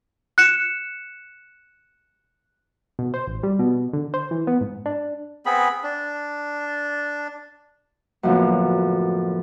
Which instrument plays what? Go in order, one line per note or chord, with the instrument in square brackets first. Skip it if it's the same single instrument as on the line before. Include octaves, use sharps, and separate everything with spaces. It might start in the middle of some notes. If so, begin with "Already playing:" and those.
[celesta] F#6 C#7 E7
[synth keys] B2
C5
A1
G3
B2
D3
C5
E3
B3
G#2
D4
[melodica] B3 C4 G#4 B5
D4
[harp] F#2 A2 D3 F3 A#3 B3